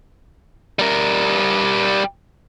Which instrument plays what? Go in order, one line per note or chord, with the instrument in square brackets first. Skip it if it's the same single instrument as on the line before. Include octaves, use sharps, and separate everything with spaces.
[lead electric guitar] G3 A#4